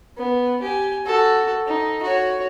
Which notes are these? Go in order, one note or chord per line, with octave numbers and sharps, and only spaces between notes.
B3
G4 G#5
F#4 A4
D#4
F#4 C#5